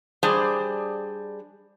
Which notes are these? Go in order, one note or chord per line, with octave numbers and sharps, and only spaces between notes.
G3 D4 G#4 C5 D5